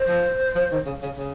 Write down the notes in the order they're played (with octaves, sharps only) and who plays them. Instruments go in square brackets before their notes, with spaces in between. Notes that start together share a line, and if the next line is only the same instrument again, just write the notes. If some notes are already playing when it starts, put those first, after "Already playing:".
Already playing: [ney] C5
[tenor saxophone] F3
F3
D#3
C#3
C#3
C#3